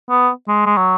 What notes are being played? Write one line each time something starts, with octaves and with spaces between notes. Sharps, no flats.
B3
G#3
G#3
F#3